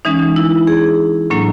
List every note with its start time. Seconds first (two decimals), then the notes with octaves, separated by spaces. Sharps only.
0.05 E3 G#3 C#4 D#4
0.36 E4
0.67 G#4
1.30 A2 F#3 A#3 D4